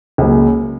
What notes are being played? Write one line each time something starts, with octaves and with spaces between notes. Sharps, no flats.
C#2 C#3 F#3 A#3